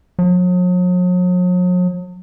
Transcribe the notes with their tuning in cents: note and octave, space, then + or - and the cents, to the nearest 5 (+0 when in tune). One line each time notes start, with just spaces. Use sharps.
F#3 -45